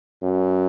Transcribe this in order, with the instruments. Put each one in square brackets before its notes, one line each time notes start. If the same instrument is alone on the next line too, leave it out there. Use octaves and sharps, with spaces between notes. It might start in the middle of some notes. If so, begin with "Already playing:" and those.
[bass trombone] F#2